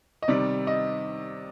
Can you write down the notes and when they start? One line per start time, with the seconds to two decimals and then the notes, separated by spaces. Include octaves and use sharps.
0.22 D#5
0.28 C3 D#3 G3 D5
0.67 D#5